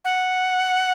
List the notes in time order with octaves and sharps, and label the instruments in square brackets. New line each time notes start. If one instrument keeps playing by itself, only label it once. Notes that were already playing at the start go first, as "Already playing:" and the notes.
[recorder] F#5